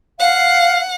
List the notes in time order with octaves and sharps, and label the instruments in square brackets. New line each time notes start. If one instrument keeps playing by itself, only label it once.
[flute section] F5 [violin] F#5